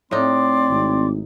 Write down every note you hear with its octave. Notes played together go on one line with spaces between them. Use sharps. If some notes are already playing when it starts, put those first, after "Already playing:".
A2 C4 D#4 D5 C6 D6
G#1